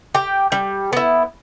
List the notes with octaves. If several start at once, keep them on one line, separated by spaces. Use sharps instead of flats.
G4 G5
G3
B3 E4